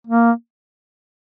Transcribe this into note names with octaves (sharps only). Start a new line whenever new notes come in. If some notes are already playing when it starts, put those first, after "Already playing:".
A#3